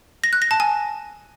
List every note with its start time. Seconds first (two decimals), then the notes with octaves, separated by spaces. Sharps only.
0.24 A#6
0.33 F#6
0.42 A#6
0.51 A5
0.60 G#5